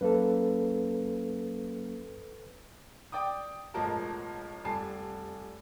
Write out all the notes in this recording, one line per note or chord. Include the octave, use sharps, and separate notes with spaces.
F#2 A#3 A4 B4
D5 G5 D6 D#6
E1 A1 F3 G#3 A#4 A5
F1 G3 G#5 A5 C7